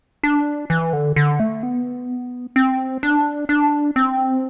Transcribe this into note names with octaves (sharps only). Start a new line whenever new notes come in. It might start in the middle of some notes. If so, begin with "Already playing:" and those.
D4
E3
D3
D3
A3
B3
C4
D4
D4
C4